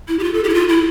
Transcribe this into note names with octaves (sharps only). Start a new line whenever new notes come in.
E4
G4
F4
A4
G4
E4
F4
E4